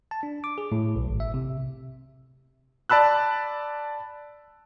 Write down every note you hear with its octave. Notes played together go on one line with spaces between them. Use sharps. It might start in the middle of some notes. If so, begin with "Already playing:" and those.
A5
D4
D6
G#4
A2
B1
G#1
E5
C3
D5 A5 B5 E6 F#6